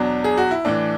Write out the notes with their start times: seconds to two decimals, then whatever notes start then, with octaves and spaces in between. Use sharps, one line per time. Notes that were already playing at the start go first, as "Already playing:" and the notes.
Already playing: E2 B2 F#3 D4
0.24 G#4
0.38 F#4
0.51 E4
0.65 A2 E3 D4